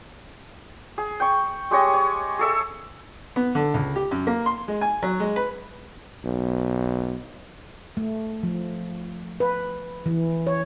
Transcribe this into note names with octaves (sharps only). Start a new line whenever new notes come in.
G#4
G5 C#6
G#3 G4 C#5 D#5
C#5
G#4 A4 E5
B3
D3
C#2
G4
F#2
A#3
C6
G#3
G#5
F#3
G#3
B4
B1
A3
F3
B4
E3
C#5